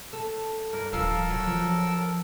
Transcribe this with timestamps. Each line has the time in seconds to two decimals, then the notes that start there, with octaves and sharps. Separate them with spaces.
0.13 A4
0.73 G2 A#4
0.93 D1 G2 F3 A4 A#4 F5 E6
1.30 F#3
1.47 F3